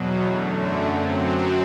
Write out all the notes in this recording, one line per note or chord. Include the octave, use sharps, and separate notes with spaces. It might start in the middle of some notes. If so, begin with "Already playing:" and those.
Already playing: E2 B2 F#3
F#2 D3 A3
F#2 F#3 C4